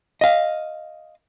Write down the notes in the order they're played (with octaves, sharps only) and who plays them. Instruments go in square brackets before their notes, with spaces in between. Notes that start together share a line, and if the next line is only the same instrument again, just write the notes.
[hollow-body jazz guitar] D#5 F5